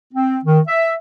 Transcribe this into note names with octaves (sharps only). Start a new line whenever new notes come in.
C4
D#3
E5